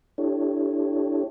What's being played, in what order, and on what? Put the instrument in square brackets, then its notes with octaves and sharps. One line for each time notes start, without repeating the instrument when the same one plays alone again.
[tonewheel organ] D4 E4 G4 A4 C#5